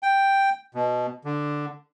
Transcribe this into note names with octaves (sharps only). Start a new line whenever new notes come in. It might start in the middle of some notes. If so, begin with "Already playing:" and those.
G5
B2
D3